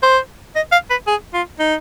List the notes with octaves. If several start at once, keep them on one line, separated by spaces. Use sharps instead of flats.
C5
D#5
F5
B4
G#4
F4
D#4